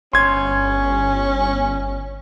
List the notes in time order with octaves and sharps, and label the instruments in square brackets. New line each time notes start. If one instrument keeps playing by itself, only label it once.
[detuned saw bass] G1 [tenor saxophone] C#4 [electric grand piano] C6 G#6